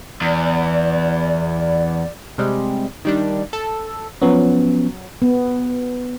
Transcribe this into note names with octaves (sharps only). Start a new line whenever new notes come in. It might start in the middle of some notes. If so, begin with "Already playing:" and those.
E2 D5
C3 G3 G#3
D#3 G3 D4
A4
F3 F#3 B3 C#4
B3